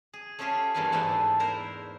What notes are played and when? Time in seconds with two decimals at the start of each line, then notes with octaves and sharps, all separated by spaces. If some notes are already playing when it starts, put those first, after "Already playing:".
0.13 G#4
0.39 A3 C#4 F4 G4 G#4 C#5
0.74 E2 G2 E3 A#3 D4 G#5
0.92 G#2 A3 B3 D4 B4
1.40 E4 A#4 C5